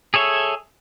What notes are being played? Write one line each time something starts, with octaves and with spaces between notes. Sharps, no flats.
G#4 A4 C#5 E5